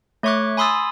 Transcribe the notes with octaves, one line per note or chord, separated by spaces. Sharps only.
A3 C#5 E5 C#6 D6 F#6
G#5 B5 C6 D#6 E6 A6